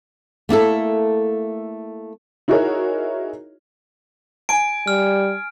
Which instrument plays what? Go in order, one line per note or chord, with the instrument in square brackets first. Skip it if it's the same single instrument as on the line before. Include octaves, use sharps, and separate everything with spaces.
[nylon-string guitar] A3 A#3 E4 A4
[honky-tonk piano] D#4 E4 F#4 G#4 A#4 C#5
[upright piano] G#5 [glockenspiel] D7
[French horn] G3 [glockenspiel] F6